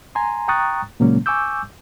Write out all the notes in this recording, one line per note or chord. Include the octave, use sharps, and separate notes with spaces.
G#5 A#5 C6
G5 A#5 C#6 D#6 F#6 A6
A#2 C#3 F#3 G#3 A#3 C#4
G#5 C#6 D6 E6 G6